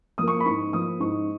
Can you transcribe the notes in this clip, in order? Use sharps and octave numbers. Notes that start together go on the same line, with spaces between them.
F3 A#3 D#6
C#6
B5
G#2 C#6
F3 A#3 D#6
G#2 C#6